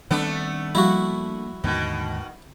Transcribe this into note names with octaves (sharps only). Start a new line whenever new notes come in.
D#3 G3 A3 B3 C4 D4
F3 G3 A#3 E4 F#4 F5
D#2 G#2 B2 D3 D#3